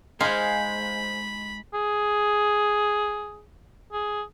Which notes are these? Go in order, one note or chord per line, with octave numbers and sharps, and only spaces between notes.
G#3 D#4 C5 F5 G#5 B5
G#4
G#4